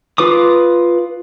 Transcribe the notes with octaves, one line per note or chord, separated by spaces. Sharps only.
F4 B4 D6 D#6